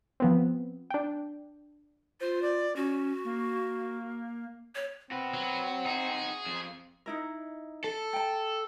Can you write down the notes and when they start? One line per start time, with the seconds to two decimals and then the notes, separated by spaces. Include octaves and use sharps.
0.20 F3 B3 C4
0.90 D4 G5
2.21 F4 C5
2.42 D5
2.76 C#4 F#4
3.25 A#3
4.75 C#5
5.11 C4 F#4 B4 F#5
5.34 F#3
5.86 D#4 F#4 G#4
6.46 F2
7.06 D#4 E4 A#4
7.84 A4
8.13 G5 A5